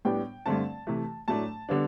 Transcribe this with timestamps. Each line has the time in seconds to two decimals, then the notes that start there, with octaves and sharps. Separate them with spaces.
0.05 A2 G3 B3 D4 G5
0.46 G2 D3 A3 C4 A5
0.87 C3 E3 A3
1.28 A2 F#3 A3 D4 A5
1.69 D3 G3 B3 D4